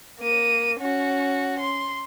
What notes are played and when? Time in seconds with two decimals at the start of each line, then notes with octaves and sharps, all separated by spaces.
0.20 A#3 D#7
0.80 C#4 F#4
1.59 C6